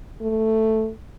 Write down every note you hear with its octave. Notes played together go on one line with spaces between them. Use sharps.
A3